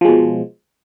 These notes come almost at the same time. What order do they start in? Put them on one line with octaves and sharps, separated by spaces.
F3 G#3 B2